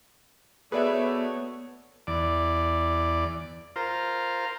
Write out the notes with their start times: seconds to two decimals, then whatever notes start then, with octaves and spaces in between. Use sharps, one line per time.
0.72 A3 B3 F#4 G#4 B4 C#5 D5 E5
2.07 E2 D5
3.76 F4 A#4 C5